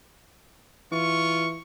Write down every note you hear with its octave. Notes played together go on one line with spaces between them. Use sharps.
E3 F4 C#6